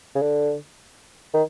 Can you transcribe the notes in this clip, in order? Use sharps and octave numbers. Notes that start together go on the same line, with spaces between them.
C#3
D3
D#3